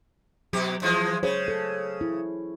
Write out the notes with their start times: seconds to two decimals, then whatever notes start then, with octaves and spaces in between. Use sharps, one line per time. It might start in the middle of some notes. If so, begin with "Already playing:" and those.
0.53 B2 F#3 G4
0.82 E3 F3 G#3
1.23 C#3 G#4 C5 C#5
1.48 A4
2.01 E4